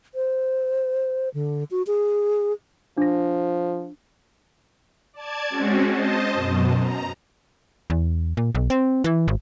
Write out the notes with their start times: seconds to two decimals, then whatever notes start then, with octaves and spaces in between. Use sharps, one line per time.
0.15 C5
1.34 D3
1.71 F#4
1.87 G#4
2.98 F3 D4 A#6
5.13 D5 A5 G#6
5.50 G#3 C4 C#4 F#4
5.89 C5 D#5 A5
6.33 F#2 B2
6.79 A#5
7.90 E2
8.37 A#2
8.55 B1
8.70 C4
9.04 E3
9.28 G#1